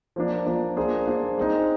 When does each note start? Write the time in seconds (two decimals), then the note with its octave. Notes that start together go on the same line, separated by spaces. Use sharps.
0.16 F3 A#3 D4
0.46 F3 A#3 D4
0.77 A#3 D4 G#4 C5
1.07 A#3 D4 G#4 C5
1.38 G#3 C4 D#4